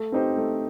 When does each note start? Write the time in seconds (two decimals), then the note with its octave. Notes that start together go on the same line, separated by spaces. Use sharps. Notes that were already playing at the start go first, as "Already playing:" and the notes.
Already playing: A3
0.12 C4 D#4 G4 C5
0.37 A3